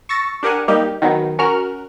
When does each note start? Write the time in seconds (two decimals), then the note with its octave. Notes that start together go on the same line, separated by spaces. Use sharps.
0.09 C#6 E6 A6 A#6
0.43 D4 G4 A#4 F#5 G#5
0.68 G3 A#3 D#4 G4
1.02 D#3 F#3 B3
1.39 C#4 F#4 A#4 F6